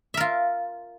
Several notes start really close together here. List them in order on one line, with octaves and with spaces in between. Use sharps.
E5 A#4 F4